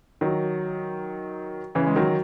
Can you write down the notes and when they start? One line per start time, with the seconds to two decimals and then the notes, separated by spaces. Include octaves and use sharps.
0.21 D#3 F#3
1.75 C#3 E3
1.87 G#3
1.96 D#3 F#3